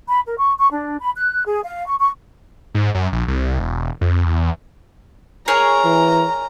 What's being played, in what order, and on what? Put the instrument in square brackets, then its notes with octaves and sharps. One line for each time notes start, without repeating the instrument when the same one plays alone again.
[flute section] B5
A#4
C#6
C#6
D4
B5
F#6
G#4
F5
C#6
C#6
[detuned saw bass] G#2
F#2
A#1
C2
E1
F2
E2
[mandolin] G#4 A#4 C#5 [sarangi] A#5
[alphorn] E3